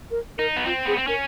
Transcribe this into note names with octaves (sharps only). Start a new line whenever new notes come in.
A#4
D#4 A#4
B3
C4 F4
B3 G#4
C4
C#4 A#4